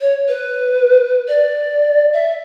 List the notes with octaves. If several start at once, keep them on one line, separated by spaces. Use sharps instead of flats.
C#5
B4
D5
E5